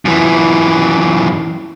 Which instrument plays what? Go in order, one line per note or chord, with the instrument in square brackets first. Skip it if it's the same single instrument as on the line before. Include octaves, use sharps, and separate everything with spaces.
[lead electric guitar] F#2 E3